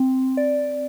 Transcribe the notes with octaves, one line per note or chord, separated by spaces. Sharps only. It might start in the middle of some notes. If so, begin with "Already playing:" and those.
Already playing: C4
D5